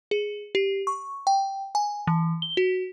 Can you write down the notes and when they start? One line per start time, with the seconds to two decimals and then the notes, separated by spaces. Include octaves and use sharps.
0.11 G#4
0.55 G4
0.87 C#6
1.27 G5
1.75 G#5
2.07 E3
2.42 G7
2.57 F#4